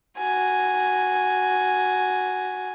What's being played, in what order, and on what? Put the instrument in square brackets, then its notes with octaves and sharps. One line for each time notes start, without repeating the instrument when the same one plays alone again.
[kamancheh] F#4 G#5